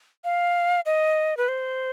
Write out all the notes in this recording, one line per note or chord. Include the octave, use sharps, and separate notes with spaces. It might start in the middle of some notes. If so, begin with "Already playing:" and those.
F5
D#5
B4
C5